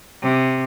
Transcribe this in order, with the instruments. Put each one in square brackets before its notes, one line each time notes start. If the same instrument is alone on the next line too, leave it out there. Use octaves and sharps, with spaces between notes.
[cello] C3